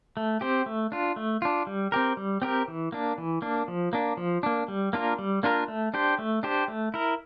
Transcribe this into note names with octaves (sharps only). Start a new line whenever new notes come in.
A3
C4 G4 C5
A3
D4 F4
A3
D4 F4
G3
C4 G4 A#4
G3
C4 G4 A#4
E3
A#3 D4
E3
A#3 D4
F3
A#3 D4
F3
A#3 D4
G3
A#3 D4 F4 A#4
G3
A#3 D4 F4 A#4
A3
D4 G4 C5
A3
D4 G4 C5
A3
E4 A#4